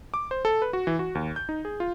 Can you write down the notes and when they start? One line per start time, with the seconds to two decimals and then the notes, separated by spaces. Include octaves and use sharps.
0.14 D6
0.31 C5
0.45 A4
0.62 B4
0.73 F#4
0.87 E3
0.99 F#4
1.15 D#2
1.36 G6
1.49 D#4
1.65 G#4
1.80 F4